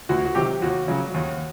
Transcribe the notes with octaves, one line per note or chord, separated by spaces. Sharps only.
D2 F#4
F#4
C3 D#3 F#3 G4
D#2 F#4
C#3 F#3
D#2